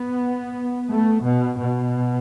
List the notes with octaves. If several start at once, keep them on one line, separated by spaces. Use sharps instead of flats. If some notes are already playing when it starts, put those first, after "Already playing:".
Already playing: B3
A3
B2
B2